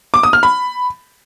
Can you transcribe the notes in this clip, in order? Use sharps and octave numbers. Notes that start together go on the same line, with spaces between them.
D6
D#6
F6
B5